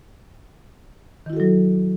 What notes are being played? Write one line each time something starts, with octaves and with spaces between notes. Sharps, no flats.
D#3 F#3 E4 F#4 A4